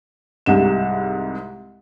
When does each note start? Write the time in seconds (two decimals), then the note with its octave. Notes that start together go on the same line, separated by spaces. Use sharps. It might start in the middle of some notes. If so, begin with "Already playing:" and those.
0.46 C2 G#2 C3 E7